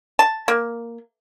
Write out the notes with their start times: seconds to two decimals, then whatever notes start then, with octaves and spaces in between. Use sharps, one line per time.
0.19 A5
0.48 A#3